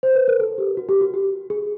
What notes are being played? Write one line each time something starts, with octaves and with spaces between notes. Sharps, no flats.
C5
B4
A#4
A4
G4
F#4
G4
F#4
G4
G#4